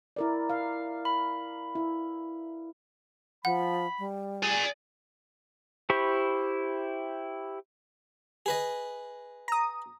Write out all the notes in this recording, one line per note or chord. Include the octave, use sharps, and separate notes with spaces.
E4 A#4 D5
F5
B5
E4
F3 F#5 B5
G3
G#4 D5 G#5
E4 G4 C5 B5 C#6
G#4 B4 D#5
A#5 D#6